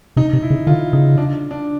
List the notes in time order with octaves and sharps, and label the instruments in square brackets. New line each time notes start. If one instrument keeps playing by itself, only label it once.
[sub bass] C3 [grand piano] D#4
[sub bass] C3
[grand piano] E4
[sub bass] C#3
[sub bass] D3 [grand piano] F4
[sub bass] C#3 [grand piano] D#4
[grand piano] D4
D4